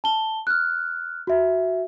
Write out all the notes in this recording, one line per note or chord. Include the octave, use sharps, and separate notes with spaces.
A5 G7
F6 F#6
F#4 E5